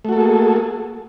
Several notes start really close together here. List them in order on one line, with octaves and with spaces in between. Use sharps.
A3 F#4 A4 A#3 G#4